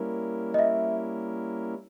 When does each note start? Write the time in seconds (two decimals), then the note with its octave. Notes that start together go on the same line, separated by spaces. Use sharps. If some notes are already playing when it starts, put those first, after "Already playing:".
Already playing: G3 A#3 C#4 E4 A#4
0.54 D#5
0.59 E5